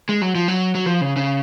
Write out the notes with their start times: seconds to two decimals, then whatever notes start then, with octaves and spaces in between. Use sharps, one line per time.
0.09 G#3
0.22 F#3
0.35 F3
0.48 F#3
0.75 F#3
0.86 F3
1.01 C#3
1.16 C#3